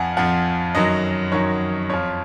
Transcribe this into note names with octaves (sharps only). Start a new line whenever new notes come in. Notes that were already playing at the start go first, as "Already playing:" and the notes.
Already playing: F2 F3 F#5 G#5
F2 F3 F#5
F#2 D#3 F#3 D#5
F#2 D#3 F#3 C#5
F2 F3 C#5